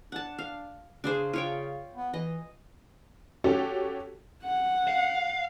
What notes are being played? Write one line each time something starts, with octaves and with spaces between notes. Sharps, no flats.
D4 F#5 A5
F5
C#3 D4 G#4 C5
F4 C#5 G5
B3
E3 D#5
C#4 F#4 G4 A4 C#5
F#5
F5